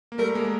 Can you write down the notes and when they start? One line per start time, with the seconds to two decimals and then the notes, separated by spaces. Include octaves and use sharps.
0.12 A#3
0.18 G3 A3 A#4
0.35 G#3 A#3